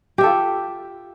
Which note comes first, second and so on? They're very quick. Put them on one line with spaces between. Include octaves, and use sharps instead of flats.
G4 E5 A4 F4